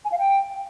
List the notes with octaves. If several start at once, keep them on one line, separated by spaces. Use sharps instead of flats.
G#5
F5
G5